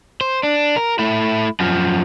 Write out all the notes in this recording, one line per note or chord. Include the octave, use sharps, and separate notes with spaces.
C5
D4
A#4
A3 E4
F#2 F3